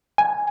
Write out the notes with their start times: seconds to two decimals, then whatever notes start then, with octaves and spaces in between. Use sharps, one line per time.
0.18 G#5